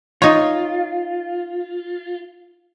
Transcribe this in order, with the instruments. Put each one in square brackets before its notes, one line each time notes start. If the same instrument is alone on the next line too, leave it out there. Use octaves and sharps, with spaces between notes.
[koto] D#4 C#5 [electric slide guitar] F4